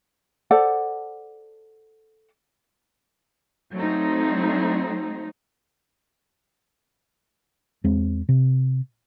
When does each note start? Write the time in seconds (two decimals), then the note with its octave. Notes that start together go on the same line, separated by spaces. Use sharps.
0.51 A4 C5 D5 F#5
3.73 F#3 A3 C4 D#4
7.84 E2 G#3 C4
8.29 C3